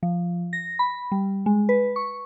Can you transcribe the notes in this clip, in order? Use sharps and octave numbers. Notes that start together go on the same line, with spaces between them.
F3
A#6
B5
G3
G#3
B4
C#6